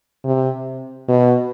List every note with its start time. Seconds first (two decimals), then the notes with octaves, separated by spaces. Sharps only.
0.25 C3
1.09 B2